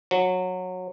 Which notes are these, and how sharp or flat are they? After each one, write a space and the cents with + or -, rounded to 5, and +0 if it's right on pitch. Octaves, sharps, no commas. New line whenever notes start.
F#3 -20